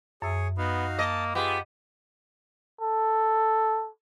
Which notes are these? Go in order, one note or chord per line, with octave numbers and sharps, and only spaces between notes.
F#2 G#4 C#5 E5 E6
B3 D#4 F#4 F5
A#3 D#5 A5
B3 F4 G4 G#4
A4